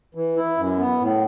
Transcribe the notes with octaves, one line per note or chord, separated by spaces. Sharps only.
E3
E4
F#2
B3
A2